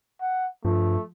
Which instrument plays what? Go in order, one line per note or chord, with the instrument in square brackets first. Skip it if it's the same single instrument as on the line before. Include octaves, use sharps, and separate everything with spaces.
[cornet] F#5
[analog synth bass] G2 [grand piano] F3 [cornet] A3